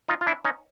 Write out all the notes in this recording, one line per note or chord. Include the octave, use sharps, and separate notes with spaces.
D#4 F4
F4
D4 E4
C#4 D#4